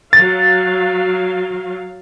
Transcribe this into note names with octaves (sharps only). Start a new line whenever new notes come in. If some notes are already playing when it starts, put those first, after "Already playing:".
F#3 F5 A6